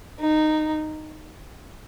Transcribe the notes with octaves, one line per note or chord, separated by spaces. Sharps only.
D#4